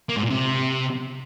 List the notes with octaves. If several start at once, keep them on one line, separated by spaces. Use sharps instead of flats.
A#3
G#2
A#2
C3